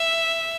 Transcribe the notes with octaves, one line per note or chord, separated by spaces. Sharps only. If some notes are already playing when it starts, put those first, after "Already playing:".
Already playing: E5